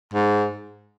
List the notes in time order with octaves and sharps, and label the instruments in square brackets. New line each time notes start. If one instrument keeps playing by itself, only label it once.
[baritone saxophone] G#2